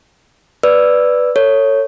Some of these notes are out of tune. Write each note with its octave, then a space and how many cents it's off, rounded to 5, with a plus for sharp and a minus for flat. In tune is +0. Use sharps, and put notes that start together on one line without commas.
B4 +0 D5 +0 E6 +0
A4 +30 C#5 +0